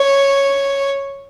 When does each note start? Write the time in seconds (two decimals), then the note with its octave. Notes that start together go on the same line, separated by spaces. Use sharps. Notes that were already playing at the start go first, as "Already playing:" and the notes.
Already playing: C#5